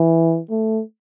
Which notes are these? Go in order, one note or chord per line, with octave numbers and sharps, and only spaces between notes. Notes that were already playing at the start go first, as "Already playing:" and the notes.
Already playing: E3
A3